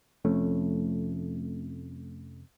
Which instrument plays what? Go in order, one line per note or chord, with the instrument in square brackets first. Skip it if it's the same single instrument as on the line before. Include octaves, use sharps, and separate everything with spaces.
[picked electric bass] F1 F2 A3 C#4